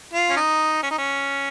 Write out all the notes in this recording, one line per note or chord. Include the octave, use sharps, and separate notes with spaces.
F4
C#4
D#4
C#4
D#4
C#4